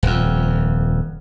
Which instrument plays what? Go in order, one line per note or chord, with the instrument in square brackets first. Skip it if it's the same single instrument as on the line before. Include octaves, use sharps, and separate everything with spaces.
[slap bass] D#1 F2